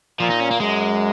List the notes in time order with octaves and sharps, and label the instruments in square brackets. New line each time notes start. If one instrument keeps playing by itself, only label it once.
[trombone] A#2 [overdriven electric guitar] F3
[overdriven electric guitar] D#4
C#4
A#3
[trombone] F#2 [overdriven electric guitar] G#3